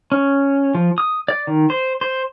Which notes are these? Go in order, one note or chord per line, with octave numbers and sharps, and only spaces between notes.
C#4
F3
D#6
D5
D#3
C5
C5